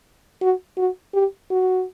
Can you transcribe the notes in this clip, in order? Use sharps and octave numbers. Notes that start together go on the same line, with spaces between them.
F#4
F#4
G4
F#4